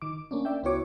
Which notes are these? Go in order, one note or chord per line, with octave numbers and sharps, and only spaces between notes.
D#3 D6
A#3 C#4 D4
D5 E5 G5
C#2 B3 E4 F#4 C#5 D6